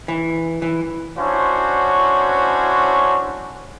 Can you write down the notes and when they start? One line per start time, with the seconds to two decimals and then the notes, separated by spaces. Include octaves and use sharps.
0.08 E3
0.62 E3
1.17 C#4 D4 E4 F#4 C5 C#5